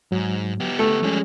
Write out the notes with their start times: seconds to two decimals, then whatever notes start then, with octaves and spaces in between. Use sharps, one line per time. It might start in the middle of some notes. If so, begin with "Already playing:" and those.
0.12 G#2 F#3
0.60 B3 G4
0.79 A3
1.03 F3 G3 G#3 C#4 G#4